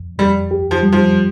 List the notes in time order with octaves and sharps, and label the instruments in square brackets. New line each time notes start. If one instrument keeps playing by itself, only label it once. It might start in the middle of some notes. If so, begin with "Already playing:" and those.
Already playing: [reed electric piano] F2
[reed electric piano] F2 [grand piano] G3
[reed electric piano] G4
[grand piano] F3
[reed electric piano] G3
[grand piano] F3